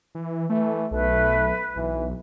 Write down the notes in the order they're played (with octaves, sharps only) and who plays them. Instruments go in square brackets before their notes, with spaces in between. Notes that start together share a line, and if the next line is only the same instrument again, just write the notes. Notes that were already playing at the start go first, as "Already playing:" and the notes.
[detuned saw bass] E3
[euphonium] E3 [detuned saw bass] A3
[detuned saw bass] B1 [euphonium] A3 [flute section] B4
[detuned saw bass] B1 [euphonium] E3